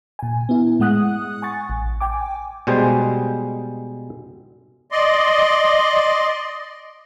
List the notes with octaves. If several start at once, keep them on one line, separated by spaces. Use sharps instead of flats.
A#2 G#5
B3 E4
A2 G#3 F#5 D#6 F#6
G#5 C#6 A6
A1
G5 G#5 D6
B2 G3 G#3 C5
D5 D#5 C6